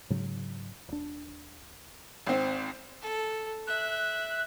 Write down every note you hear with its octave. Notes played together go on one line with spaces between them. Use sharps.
G#2 C#3 F#3
D#1 D4
G#1 C4
A4
E5 F#6